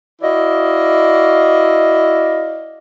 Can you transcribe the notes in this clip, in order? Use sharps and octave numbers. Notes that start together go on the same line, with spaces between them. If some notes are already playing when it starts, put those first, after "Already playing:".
E4 F#4 D5 D#5 F5